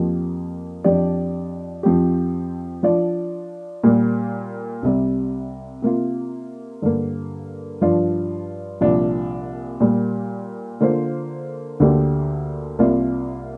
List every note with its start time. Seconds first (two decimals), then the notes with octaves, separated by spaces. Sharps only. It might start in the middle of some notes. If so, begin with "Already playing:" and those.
Already playing: F2 F3 A#3 G4
0.84 F2 F3 D4 G4 D5
1.83 F2 F3 C4 G4
2.83 F3 D4 F4 D5
3.84 A#2 G3 A#3
4.83 C2 C3 G3
5.82 C3 A#3 F4
6.82 G2 D3 A#3
7.81 G2 F3 D4 F4 D5
8.81 C2 A#2 F3 D4 F4
9.80 A#2 G3 A#3
10.80 D3 A#3 F4 C5
11.80 D2 D3 A#3 G4 D5
12.79 C2 C3 A#3 F4 D5